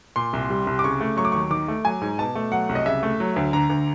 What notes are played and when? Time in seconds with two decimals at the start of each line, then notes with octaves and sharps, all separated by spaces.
0.16 A#2 C6
0.33 C2
0.50 G3
0.67 C2
0.79 D6
0.84 C#3 C#6
1.01 A3
1.17 F#3 C#6
1.25 D6
1.32 D#2 C#6
1.50 D#3 D6
1.68 A3
1.85 F#3 G#5
2.01 G#2
2.18 B2 A5
2.35 A3
2.51 F#3 F#5
2.69 C2
2.75 D#5
2.86 C#3 E5
3.03 A3
3.20 F#3
3.36 D2
3.53 D3 A#5
3.70 D2